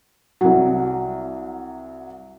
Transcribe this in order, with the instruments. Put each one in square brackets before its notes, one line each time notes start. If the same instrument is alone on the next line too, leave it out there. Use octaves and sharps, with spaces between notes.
[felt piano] C2 F#3